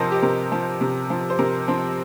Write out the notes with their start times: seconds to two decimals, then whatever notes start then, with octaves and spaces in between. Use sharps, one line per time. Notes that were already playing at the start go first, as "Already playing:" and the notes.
Already playing: C3 F3 A#4 C5 D#5
0.12 G4
0.22 C3 A#4
0.52 F3
0.81 C3
1.10 F3
1.30 C5
1.39 C3 A#4
1.68 F3 C4